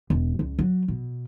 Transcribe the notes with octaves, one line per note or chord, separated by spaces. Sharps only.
E1
C#2
F#3
B2